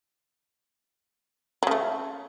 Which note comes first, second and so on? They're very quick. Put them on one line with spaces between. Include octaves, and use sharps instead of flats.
F#3 C#3 A3